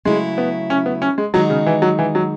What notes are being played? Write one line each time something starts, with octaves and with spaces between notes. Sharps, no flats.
C#3 F#3 G#3 A3 E4
B3
C#4
B3
C#4
G#3
D#3 F#3 G#3 D#4 F#4
C#3
E3
F#3
E3
F#3